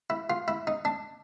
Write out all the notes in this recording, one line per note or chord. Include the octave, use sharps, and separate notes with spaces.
E4
F4
E4
D#4
D4